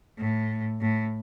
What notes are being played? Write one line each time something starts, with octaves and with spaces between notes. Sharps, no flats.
A2
A2